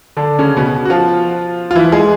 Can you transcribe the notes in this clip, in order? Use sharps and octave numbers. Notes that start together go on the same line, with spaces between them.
D3 D4
C#3 C#4
B2 B3
F#4
F3 F4
F4
E3 E4
G#3 G#4